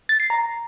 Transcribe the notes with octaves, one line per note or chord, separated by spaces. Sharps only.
A6
C7
A#5